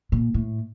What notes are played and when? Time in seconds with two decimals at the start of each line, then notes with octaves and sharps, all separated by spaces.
0.12 A#2
0.34 A2